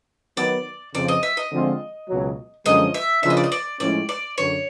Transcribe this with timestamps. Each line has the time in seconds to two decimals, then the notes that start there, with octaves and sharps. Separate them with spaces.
0.37 D#3 F#3 B3 D5
0.94 F2 C#3 F3 D5
1.08 D#5
1.23 E5
1.37 D#5
1.52 D3 F3 G#3 C4 F4
2.08 C#2 B2 F#3
2.66 F#2 D3 F3 G#3 C#4 D#5
2.94 E5
3.23 C#3 F3 A#3 D4 F4 E5
3.30 D#5
3.37 D5
3.44 D#5
3.52 D5
3.80 A2 F3 G#3 C#4 D5
4.09 D5
4.37 F#2 D3 C#5